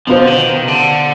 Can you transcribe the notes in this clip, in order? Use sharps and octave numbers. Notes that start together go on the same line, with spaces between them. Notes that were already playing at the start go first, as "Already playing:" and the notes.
B2 F3 B3 F4 C5
D3
D#3
D#3
C3
D3